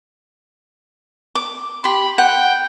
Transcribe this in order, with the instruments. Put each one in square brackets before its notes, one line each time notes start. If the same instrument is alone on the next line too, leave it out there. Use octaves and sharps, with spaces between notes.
[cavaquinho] D6
[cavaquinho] G4 C6 [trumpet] B5
[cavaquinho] F#5 [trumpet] G5